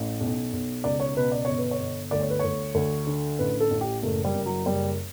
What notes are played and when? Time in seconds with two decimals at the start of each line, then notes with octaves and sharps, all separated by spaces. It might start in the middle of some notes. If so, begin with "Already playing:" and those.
Already playing: A1
0.21 B1
0.53 B1
0.84 C#2 D5
1.00 C#5
1.17 B2 B4
1.32 D5
1.45 G1 C#5
1.58 B4
1.71 C#5
1.80 G1
2.11 D2 D5
2.21 C#5
2.30 B4
2.39 D2 C#5
2.75 D2
3.07 D3
3.39 A1 B4
3.60 A4
3.71 A1
3.81 G4
4.02 F#1 A3
4.25 G3
4.35 F#1
4.46 F#3
4.66 F#1 G3